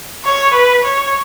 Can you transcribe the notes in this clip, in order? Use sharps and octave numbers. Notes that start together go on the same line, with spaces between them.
C#5
B4
C#5